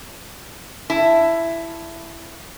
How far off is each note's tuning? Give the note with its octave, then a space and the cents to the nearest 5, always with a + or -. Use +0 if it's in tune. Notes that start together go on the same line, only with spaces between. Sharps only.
E4 +10 A5 +0